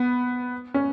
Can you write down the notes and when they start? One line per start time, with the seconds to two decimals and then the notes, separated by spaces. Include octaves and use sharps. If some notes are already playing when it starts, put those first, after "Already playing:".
Already playing: B3
0.74 C#4